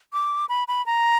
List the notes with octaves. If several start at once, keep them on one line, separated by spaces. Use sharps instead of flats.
D6
B5
B5
A#5